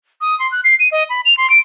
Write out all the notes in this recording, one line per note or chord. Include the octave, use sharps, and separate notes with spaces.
D#6
C6
F#6
C7
D#7
D#5
B5
F7
C6
D7